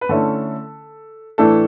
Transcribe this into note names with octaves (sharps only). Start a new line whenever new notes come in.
B4
D3 A3 C#4 E4 A4
A2 E3 A3 D4 A4